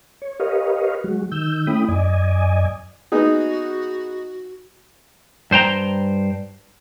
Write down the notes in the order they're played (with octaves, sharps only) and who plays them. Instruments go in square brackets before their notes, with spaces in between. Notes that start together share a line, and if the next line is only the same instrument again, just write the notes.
[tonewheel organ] C#5
G4 A#4 B4 C#5 D#5 F5
F#3 G#3 F#4
D#3 E6 G6
A3 C#4 E4 G5 B5 D#6
F#2 D5 D#5 G#5
[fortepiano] B3 D#4 G#4 [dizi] F#4
[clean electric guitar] G2 C5 G5 A#5